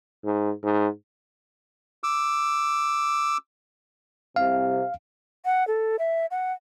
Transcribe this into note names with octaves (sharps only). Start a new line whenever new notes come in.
G#2
G#2
D6 E6
C2 C3 F5
F#5
A4
E5
F#5